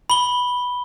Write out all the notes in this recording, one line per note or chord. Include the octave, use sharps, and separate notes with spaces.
B5 G7